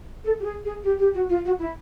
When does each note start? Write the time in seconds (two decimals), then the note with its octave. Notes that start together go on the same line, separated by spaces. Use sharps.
0.24 A4
0.40 G4
0.44 G#4
0.65 G#4
0.84 G4
0.99 G4
1.14 F#4
1.29 F4
1.45 F#4
1.59 E4